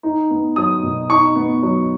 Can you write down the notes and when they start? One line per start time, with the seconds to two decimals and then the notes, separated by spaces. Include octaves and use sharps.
0.03 D#4
0.30 B3
0.56 F#3 D#6
0.83 B2
1.09 D#4 C#6
1.36 B3
1.63 F#3